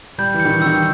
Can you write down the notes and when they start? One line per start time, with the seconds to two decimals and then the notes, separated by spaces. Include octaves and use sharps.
0.18 G3 G6
0.34 E3
0.40 C#7
0.45 D#3
0.50 E3
0.62 D#3 E6